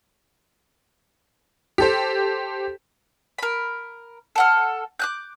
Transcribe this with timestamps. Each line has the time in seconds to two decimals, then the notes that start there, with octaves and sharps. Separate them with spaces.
1.78 G4 A4 C5
3.38 A#4 B5
4.35 A4 F#5 F6
4.99 D6 F#6 G6